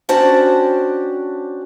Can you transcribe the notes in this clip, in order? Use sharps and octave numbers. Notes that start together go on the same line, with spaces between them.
C#4 D4 F#4 G4 C5 A5